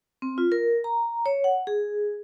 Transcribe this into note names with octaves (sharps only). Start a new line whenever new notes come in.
C4
F4
A#4
A#5
C#5
F#5
G#4